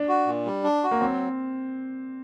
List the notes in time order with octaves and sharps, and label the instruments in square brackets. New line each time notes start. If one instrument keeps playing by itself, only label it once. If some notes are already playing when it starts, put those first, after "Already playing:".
Already playing: [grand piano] D4
[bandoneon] F#4
A#2
G3
D4
F#4
[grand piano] A#3
[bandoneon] F#3 [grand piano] C4